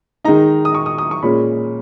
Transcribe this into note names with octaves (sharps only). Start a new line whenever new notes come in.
D#3 G#3 D#4 A#5
D#6
C#6
D#6
D#6
C#6
A#2 G#3 C#4 B5